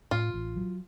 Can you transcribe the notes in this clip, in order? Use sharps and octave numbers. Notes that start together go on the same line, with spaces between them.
A2 F4
A1
F#3